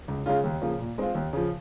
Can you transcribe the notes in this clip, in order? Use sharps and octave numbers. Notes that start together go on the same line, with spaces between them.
C#2
C#3 G#3 C#4 F4
D#2
C#3 F3 A#3
A#2
G#3 C4 F4
D#2
C#3 F3